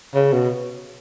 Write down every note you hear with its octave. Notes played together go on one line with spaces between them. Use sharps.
C#3
B2